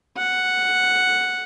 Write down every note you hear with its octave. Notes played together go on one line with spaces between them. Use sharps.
F#5